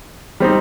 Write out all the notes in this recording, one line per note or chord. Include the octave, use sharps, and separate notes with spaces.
G3 C4 D#4